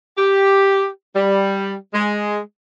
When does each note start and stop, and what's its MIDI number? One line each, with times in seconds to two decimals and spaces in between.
0.18 0.86 67
1.15 1.74 55
1.94 2.38 56